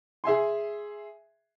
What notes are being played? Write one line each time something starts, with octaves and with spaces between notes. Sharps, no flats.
G#4 E5 G#5 C6